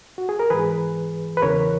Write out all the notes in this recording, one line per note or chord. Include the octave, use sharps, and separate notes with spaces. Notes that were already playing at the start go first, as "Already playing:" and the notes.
F#4
G#4
A#4
G#2 E3 G#4 B4
B4
E2 C#3 E3 A#4 C#5